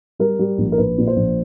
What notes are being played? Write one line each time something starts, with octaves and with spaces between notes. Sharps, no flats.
G3 A#4
G3
A#1
A#4
A#1 B4
A#2
C5
A#1